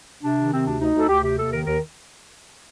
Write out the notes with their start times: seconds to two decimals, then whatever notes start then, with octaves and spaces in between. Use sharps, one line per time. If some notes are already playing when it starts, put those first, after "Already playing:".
0.23 C3 D4
0.38 D#3
0.52 C3 C4
0.66 D2 D4
0.80 D2 D#4
0.94 D2
0.99 A4
1.09 D2 G4
1.23 C3 G4
1.38 D#2 A4
1.51 D#3 A#4
1.66 D#2 A#4